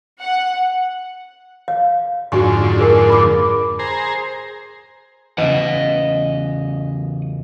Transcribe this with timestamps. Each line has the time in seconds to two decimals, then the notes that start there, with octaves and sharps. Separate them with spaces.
0.21 F#5
1.68 F5
2.32 F2 G#2 D3 F#4 G#5 C#6
2.79 G#4 A#4 G#5
3.10 B5 D6
3.79 G#4 C5 A#5
5.38 E2 C#3 D#5 F#5